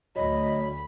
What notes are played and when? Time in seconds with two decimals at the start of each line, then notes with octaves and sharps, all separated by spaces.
0.16 D2 F#3 D#5 B5